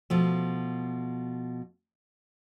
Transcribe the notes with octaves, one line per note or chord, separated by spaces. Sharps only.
B2 F3 A3